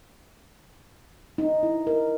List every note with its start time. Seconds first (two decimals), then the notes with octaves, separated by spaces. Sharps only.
1.38 D#4
1.63 E4
1.87 A#4